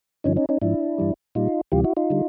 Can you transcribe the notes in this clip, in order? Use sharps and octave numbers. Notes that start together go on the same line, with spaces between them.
G2 D3 F3 C#4 D#4
C#4 D#4
C#4 D#4
G#2 F3 D4 E4
G2 E3 G3
A#2 G3 D#4 F4
D2 C3 E3 G3 F4 G4
E4 F#4
D#4 F4
D3 G3